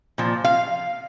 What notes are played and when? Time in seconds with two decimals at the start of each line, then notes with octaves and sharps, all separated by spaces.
0.18 A#2 F3
0.44 F5